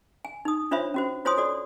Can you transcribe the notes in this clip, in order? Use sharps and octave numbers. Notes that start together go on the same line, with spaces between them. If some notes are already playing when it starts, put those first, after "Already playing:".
G#5
D#4 D#6
D4 F4 C5 C#5 E5 B5
C#4 F#4 C5
F4 C5 C#5 G#5 C6 D#6
F#4 A4 D5